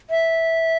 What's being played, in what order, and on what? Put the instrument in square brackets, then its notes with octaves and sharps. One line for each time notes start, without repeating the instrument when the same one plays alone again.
[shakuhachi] E5